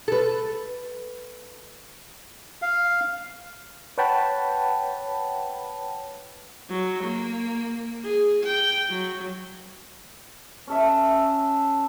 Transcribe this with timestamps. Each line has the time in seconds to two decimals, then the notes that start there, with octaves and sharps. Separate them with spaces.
0.08 A4 B4
2.62 F5
3.98 B4 C#5 F#5 G5 A5 B5
6.70 F#3
7.04 A#3
8.04 G#4
8.44 G5
8.90 F#3
10.67 C#4 A4 E5